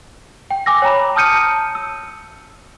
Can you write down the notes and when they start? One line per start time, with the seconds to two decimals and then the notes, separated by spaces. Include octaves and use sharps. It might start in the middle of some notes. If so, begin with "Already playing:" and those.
0.51 G5
0.66 G#5 D6 E6 A#6
0.82 C#5 G5 A#5 B5
1.16 A5 D#6 F6 G6 C#7 D#7
1.75 E6